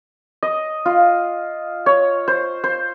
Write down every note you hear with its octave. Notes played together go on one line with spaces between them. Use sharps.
D#5
F4
C#5
C5
C5